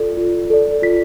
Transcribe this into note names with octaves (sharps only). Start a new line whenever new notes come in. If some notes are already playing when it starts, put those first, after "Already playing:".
Already playing: F4 A4 D5
F4
A4 D5
F4 B6